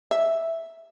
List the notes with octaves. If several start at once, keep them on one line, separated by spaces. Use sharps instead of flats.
E5